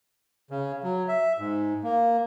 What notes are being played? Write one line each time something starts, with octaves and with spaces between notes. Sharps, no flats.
C#3
F#3
E5
G#2
A#3